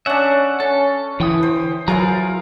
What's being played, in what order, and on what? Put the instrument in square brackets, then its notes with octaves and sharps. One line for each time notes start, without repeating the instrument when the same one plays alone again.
[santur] C#4 D4 [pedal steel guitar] E5 F#5
[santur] C#4 [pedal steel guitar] A4
[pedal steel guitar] D3 G5 D#6 [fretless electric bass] E3
[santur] C5
[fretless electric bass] F#3 [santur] E4 F4 G#4 [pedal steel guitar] A#4 B4 A#5